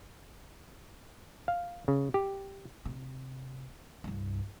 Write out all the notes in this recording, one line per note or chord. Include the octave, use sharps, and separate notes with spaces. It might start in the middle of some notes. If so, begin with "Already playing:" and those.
F5
C#3
G4
C3
C2 G2